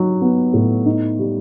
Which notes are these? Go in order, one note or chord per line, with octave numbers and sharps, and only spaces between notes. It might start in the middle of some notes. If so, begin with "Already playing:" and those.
Already playing: F#3 D#4
B3
A2
D#4
G3